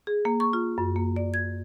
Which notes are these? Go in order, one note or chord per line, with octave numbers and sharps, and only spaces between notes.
G#4
A#3
C#6
F4
F#2
A#3
D5
G#6